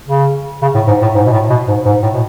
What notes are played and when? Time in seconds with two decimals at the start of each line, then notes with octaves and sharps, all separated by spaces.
0.08 C#3
0.62 C#3
0.74 A2
0.87 G#2
1.02 A2
1.15 G#2
1.26 B2
1.32 A2
1.50 B2
1.68 G#2
1.85 G#2
2.03 A2
2.13 B2